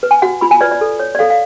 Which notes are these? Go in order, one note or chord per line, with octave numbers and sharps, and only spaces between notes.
B4
G#5
F#4 F#5
F4 B5
G#5
B4 D5
D5
A4
C#5
D5
A4 F5
F5